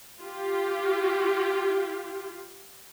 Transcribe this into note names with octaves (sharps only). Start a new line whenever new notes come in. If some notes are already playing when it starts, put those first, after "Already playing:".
F4 G4